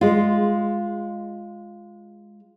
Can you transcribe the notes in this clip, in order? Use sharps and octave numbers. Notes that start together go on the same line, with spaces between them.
G#3 F4